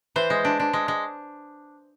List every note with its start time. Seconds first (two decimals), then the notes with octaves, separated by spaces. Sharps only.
0.16 E3 C5
0.30 G#3
0.45 D4
0.59 D4
0.73 G#3
0.88 G#3